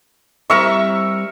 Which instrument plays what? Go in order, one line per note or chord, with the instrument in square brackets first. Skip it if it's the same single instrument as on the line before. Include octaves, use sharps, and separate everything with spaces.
[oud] G3 C4 E4 [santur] A#4 E5 C#6